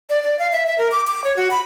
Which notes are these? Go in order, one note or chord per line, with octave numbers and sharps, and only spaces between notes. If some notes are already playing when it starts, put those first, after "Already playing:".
D5
D5
F5
E5
E5
A#4
D6
D6
C#5
F#4
B5